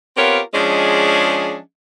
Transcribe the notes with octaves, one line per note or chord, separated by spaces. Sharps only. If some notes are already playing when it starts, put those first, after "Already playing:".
B3 C4 F4 G4 A#4 C#5
F3 G#3 C#4 D4 G#4 D#5